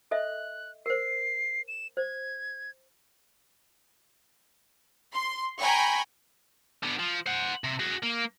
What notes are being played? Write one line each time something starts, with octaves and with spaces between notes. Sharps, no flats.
A4 D#5 E5 F#6
A#4 C5 C7
E7
C5 G#6
C6
G5 G#5 A#5 B5 C#6
D3 B3
F3
C5 F#5
C3
F#4 G#4
A#3